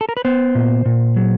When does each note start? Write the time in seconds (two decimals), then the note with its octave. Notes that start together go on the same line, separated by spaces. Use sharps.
0.01 A4
0.09 A#4
0.17 B4
0.25 B3 C5
0.55 A#2
0.86 A#2
1.16 F#3